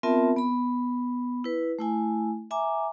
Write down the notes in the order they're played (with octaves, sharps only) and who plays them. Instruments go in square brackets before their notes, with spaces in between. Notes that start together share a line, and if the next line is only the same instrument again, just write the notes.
[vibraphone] B3 C4 F4 A#4 E5 A5
B3 B5
E4 B4
A3 E4 G#5
E5 G#5 A#5 D6